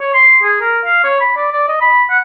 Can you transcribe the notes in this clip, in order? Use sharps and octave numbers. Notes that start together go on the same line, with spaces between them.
C#5
C6
G#4
A#4
F5
C#5
B5
D5
D5
D#5
B5
F#5